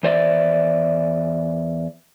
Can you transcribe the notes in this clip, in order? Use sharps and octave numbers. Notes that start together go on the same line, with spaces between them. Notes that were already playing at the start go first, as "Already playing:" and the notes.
E2 C5 D5 E5